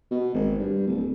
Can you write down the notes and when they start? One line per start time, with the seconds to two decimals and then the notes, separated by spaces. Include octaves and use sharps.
0.11 B2
0.34 G#1
0.58 G2
0.87 D1